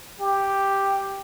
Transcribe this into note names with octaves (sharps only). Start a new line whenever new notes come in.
G4